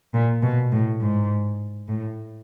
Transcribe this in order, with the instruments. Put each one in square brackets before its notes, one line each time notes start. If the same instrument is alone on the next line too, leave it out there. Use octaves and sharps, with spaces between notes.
[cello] A#2
B2
A2
G#2
A2